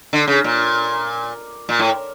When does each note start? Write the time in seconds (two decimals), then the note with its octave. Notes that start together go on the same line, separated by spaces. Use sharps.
0.13 D3
0.28 C#3
0.44 A#2
1.69 A#2
1.79 A2